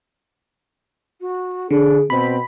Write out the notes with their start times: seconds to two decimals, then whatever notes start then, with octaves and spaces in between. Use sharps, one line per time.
1.21 F#4
1.71 D3 D4 G#4
2.10 B2 C4 B5